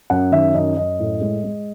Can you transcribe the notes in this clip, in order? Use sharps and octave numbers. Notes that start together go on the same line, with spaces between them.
F#2 F#5
D#3 E5
F#2 D#5
F#2 D#5
A2
G#3
G#3